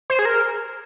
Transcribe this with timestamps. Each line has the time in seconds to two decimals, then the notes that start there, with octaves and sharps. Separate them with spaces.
0.10 C5
0.19 G#4
0.25 A#4